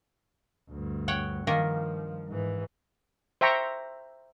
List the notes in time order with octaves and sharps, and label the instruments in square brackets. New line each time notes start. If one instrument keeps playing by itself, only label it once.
[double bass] D2 G2
[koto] C#5 F#5 G5
[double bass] G2 F3 [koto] D#3 A#3 A#4
[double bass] G#2 E3
[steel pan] C5 E5 G5 A#5 C#6